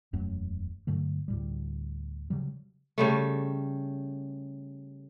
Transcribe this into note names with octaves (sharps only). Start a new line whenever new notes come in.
E1 F#2 F#3 A3
G2 D3 F#3 A3
D2 A2 G3
C#3 F#3 G3
C#3 G3 A3